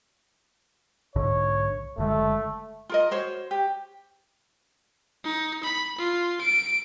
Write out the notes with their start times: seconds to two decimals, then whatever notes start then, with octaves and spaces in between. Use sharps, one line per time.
1.16 B1 G#2 D3 C#5
1.98 F#1 D3 G#3 A3
2.89 F4 A#4 D#5
3.11 F#4 C5 C#5
3.51 G4
5.24 D#4
5.63 B5
5.98 F4
6.41 D7